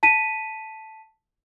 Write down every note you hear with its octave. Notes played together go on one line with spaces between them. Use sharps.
A5 B6 D#7